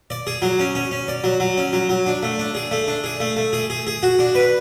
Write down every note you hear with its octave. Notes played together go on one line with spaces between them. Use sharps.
D5
G#4
F#3
C#4
C#4
C#4
D5
F#3
F#3
C#4
F#3
F#3
D4
A3
D4
G#4
A3
D4
G#4
A3
A3
G#4
G#4
G#4
F#4
D4
B4